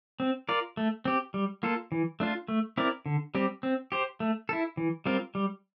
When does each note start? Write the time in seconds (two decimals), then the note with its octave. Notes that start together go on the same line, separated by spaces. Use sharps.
0.20 C4
0.49 F4 A#4 D5
0.77 A3
1.05 C4 G4
1.34 G3
1.63 A#3 F4 A4
1.92 E3
2.20 A3 D4 F4
2.48 A3
2.77 C4 E4 A#4 D5
3.06 D3
3.35 G3 C4 G4
3.63 C4
3.92 G4 C5
4.20 A3
4.49 E4 A4
4.77 E3
5.06 G3 C4 F4 A#4
5.35 G3